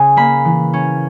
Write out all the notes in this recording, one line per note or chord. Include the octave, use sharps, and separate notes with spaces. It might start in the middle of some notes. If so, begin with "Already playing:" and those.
Already playing: C#3 C#4 G#5
A#3 B5
E3
C#4